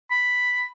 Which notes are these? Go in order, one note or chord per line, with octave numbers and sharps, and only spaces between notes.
B5